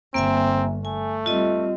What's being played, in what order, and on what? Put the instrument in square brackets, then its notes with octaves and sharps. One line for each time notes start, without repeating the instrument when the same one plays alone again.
[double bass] G1 [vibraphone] A#3 E5 G#5 [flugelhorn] C4
[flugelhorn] A3 [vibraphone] G#5
[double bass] G3 C4 [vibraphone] F4 D#5